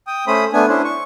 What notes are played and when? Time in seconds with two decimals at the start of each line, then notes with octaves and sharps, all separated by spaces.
0.07 G5 D#6
0.27 A3 C#4 C5 B5 D#6
0.53 A3 B3 D4 G#5
0.69 C#4 D4 E4 C5
0.85 C#6